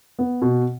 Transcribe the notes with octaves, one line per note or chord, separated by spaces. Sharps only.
B3
B2